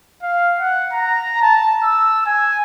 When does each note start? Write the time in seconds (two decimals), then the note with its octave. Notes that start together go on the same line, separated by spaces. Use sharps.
0.23 F5
0.59 F#5
0.93 A#5
1.42 A5
1.83 E6
2.26 G#5